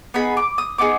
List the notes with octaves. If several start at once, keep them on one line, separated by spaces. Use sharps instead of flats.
B3 D#4 G#4 B5
D6
D#6
B3 D#4 G#4 D6